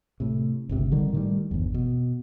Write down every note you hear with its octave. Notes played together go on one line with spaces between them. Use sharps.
A2 C3
G1 C#2 C3
D3 D#3 G3
A2 D#3 G3
G1 E2
B2